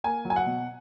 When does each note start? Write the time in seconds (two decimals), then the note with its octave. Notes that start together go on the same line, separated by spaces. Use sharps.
0.04 A#3 G#5
0.25 F#3
0.30 G#5
0.36 F#5
0.46 B2